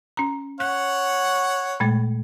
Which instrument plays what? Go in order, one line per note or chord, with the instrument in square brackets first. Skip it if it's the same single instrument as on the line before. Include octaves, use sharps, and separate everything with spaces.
[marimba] C#4 A#5
[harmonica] C#5 F#5 [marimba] F#6
[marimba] A#2 G#3 A3